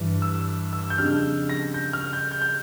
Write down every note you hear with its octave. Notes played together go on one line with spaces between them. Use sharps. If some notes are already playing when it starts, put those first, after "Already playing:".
Already playing: G2 E3 G3
E6
E6
G6
F2 C#3 G3 D4 F6
A#6
G6
F6
G6
G6
G6